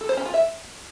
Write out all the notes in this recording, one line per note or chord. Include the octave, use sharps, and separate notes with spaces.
A4
C5
C#4
F4
E5